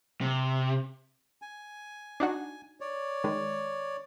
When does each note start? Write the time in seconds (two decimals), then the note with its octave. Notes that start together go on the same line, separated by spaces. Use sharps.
0.21 C3
1.42 G#5
2.20 D4 D#4 F#4
2.81 C#5 D5
3.24 D#3 G#3